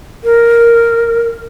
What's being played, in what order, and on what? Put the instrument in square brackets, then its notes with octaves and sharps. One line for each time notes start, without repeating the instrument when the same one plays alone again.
[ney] A#4